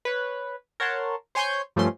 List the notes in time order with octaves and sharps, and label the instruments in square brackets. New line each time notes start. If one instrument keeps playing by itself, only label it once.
[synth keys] B4 C#5
A#4 C#5 F#5 A5 C6
C5 C#5 G#5 C6 C#6 G6
G2 F3 A3 C#4 C6